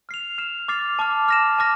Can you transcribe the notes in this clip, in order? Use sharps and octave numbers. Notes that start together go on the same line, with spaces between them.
F6 C7 F7
F6 C7 E7
D6 F6 A6 C7 F7
A5 D6 F6
F6 A#6 E7
A5 D6 F6 A#6